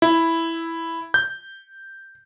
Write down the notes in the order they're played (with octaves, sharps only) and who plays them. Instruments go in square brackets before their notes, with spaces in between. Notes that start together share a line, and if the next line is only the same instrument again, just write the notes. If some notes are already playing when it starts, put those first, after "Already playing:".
[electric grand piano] E4
G6